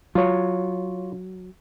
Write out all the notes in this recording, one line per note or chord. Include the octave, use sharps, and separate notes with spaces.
F#3 F4 C#5